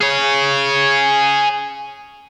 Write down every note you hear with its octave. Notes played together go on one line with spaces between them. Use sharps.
G#4 C#5